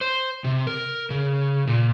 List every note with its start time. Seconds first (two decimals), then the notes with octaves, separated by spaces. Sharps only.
0.01 C5
0.44 C3
0.67 A#4
1.10 C#3
1.67 A#2